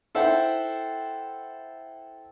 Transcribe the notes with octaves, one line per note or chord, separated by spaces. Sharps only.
E4 A4 C5 E5 F#5 G5